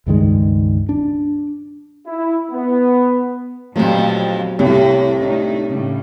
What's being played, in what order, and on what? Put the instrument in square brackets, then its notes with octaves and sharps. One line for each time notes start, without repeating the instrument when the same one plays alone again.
[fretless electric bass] C#2 G2 D#3 G#3
D4
[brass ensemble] E4
B3
[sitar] F2 F3 [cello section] A#2 D3 B3 [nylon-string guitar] F#3 A3 G4
[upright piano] C2 [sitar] A2 [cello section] C3
[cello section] D#3 A3 D#4 [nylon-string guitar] D4
[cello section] A2 G3 [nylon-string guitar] C#3